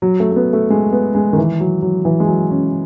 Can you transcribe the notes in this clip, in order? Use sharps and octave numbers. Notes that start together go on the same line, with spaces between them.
F#3
A3
A3
B3
A3
G#3
B3
G#3
D#3
E3
F#3
F#3
E3
G#3
F#3
C#4